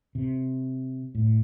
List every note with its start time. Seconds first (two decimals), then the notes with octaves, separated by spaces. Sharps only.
0.15 C3
1.15 A2